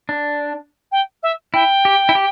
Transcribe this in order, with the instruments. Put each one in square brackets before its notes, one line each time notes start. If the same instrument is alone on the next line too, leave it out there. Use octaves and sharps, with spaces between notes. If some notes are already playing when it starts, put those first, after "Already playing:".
[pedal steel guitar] D4
[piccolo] G5
E5
[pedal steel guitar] E4 [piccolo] G5
[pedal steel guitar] G4
E4
G4